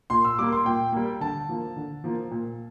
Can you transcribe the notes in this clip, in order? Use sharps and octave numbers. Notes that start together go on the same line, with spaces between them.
A#2 C6
E6
G3 A#3 D6
C6
A#2 G5
G3 A#3
D3 A5
F3 A#3
D3
F3 A#3
A#2